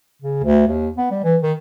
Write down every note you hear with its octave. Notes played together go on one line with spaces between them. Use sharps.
C#3
D2
D#2
B3
G3
E3
D#3